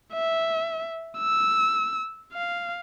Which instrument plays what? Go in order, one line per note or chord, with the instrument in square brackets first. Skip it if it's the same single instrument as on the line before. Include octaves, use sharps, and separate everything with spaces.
[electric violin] E5
E6
F5